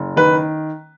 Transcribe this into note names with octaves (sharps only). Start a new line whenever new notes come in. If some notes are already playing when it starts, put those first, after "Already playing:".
Already playing: F#1
D#3 B4